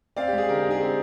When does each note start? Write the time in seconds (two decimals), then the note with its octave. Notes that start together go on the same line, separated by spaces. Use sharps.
0.16 C4 D5 F5
0.28 G4
0.33 G#3 G#4
0.49 D3 G4 A#4
0.59 G4
0.65 D#4
0.70 G#4
0.80 C4 G4